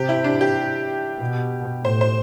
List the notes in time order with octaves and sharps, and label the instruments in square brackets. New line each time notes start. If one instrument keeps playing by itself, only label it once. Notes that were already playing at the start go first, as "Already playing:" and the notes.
Already playing: [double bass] C3 [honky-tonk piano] G4
[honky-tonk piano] E4
D4
G4
[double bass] B2
[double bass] A2 [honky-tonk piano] C5
[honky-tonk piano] C5